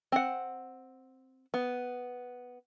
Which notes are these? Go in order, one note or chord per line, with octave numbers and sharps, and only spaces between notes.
C4 F#5
B3